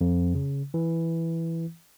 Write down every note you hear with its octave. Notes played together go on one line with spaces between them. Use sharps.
F2
C#3
E3